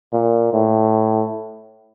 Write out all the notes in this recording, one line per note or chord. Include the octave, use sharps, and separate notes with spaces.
A#2
A2